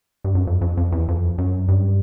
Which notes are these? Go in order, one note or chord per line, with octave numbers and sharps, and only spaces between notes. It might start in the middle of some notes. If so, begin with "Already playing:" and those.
G2
F#2
F2
F2
F2
E2
F2
F#2
G2